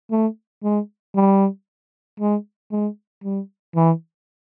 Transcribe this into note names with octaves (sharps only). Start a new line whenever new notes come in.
A3
G#3
G3
G#3
G#3
G3
E3